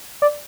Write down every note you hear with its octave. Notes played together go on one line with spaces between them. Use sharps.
D5